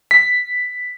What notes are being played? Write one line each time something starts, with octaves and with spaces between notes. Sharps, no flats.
B6